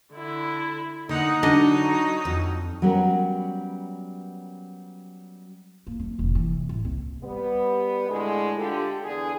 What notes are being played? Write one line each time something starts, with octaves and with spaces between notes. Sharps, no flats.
D3 E4
D3 A#3 D#4 F#5
D3 F#3 D4 D#5
F2
F#3 G3 B3 C#4 A#4
A#3
F#2
F1 A#2
E3
A1
C2 C4
G3 B3
A2 D3 G#3
D3 F4 G4
E2 D3 G#4